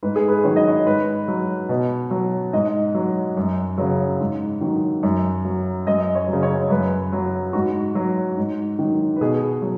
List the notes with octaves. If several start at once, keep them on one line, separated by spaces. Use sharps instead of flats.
G#2 B4
G#4
B4
D#3 F#3 C#5
D#5
C#5
G#2 B4
F#3
B2
F#3
G#2 D#5
F#3
F#2
C#3 F#3
G#2
D#3 F#3
F#2
F#3
F#2 D#5
C#5
C#3 F#3
C#5
F#2 B4
F#3
G#2 F#4
F#3
G#2
D#3 F#3
B4
B2 G#4
F#3